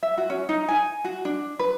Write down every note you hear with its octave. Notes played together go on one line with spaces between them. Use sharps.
E5
F#4
C#4
D#4
G#5
F#4
D4
B4